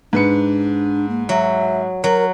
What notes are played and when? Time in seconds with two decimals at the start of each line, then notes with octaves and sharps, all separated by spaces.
0.13 G#2 D4 B4 C#7
1.09 A#3
1.29 F#3 E5
2.04 F#3 A#4